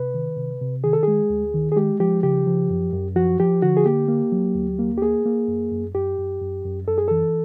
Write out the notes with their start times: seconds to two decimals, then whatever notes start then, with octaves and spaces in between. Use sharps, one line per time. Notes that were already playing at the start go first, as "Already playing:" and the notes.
Already playing: C3 B4
0.14 D#3
0.37 C3
0.61 C3
0.84 D#3 G#4
0.93 A4
1.03 G#3 G#4
1.30 D2
1.54 D#3
1.72 G#4
1.76 G#3 G4
2.00 F3 G4
2.23 C#3 G4
2.46 F3
2.70 F#2
2.93 F#2
3.16 F3 F#4
3.40 F3 G4
3.62 D3 F#4
3.77 G#4
3.86 A#3 G4
4.08 A#3
4.32 F#3
4.55 D2
4.79 A#3
4.97 G4
5.02 A#3 G#4
5.25 A#3
5.49 F#2
5.72 F#2
5.95 F#2 G4
6.18 F#2
6.41 F#2
6.65 F#2
6.87 F#2 A4
6.98 G#4
7.08 E3 A4